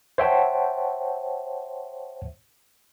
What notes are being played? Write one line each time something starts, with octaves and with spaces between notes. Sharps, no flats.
C5 C#5 E5 F#5 G5 A5